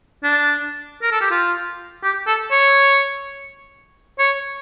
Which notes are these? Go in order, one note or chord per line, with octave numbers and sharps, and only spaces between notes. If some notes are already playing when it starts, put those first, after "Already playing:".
D4
A#4
A4
G4
F4
G4
A4
C#5
C#5